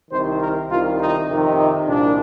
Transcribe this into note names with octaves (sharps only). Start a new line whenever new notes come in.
C2 C3 D#3 C5
A#4
C2 C3 D#3 F4
D#4
F2 C3 D#3
D#4
C2 A#2 D4